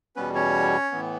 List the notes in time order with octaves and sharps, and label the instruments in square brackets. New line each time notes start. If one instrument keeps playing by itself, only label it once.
[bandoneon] E2 B2 G3 B3 C#4 B4
C#4 C#5
A2 E3 B3